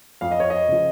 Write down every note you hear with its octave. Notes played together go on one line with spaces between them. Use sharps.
F2 F5
D#5
C#5
D#5
C#3 F3